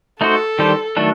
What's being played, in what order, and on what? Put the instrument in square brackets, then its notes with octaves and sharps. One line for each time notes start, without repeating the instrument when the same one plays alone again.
[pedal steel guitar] A3 D#4 F#4 C5 [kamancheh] A4
[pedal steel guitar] D#3 G3 D4 G4 C5
D#3 F#3 A3 D4 A4